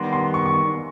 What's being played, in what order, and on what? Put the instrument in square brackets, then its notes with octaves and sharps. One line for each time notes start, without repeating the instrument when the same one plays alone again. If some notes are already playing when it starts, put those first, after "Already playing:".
Already playing: [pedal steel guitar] D#3 G3 B3 [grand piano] C6
[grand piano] C6
C#6
C#6